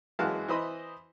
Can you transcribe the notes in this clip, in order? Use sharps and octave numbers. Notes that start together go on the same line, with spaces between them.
F#2 E3 G#3 F#4 F5 A5
E3 C5 D#5 B5 D#6